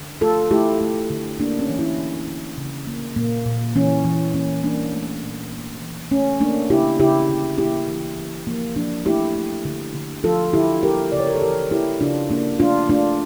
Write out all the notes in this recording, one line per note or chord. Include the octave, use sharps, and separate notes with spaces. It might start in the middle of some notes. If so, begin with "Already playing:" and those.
Already playing: D3
A3 F4 A4
A3 E4 G4
A3
D3
A3 A#3 D4
C#4
E3
C#4 E4
D3
D3
C#3
A#3
A#2 A#3
A#2
E3 C#4
E3
A#3 C#4
G3 A#3 D4
A3
A#2
A#3
E3
A3 C#4
A3 A#3 D4
C#3 E4 G4
C#3 E4 G4
D3
A#3 E4 G4
E3
E3
F3 A#3
F3 A#3 D4
A3 E4 G4
A3
D3
D3
F3 F4 A4
D3 E4 G4
A#3 G4 A#4
C#3 D5
C#5
A#4
A4 C#5
E3 G4 A#4
A#3 E4 G4
C#3 D4 F4
A#3 D4
A3 D4 F4
A3 D4 F4